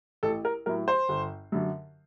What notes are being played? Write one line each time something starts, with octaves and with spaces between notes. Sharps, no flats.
A1 A4
A#4
A2 F#3 A#4
C5
G1
F#2 D3 F#3